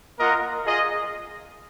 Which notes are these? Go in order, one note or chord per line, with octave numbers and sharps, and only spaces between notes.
A#3 F4 A#4 D#5 F#5
F4 G#4 D#5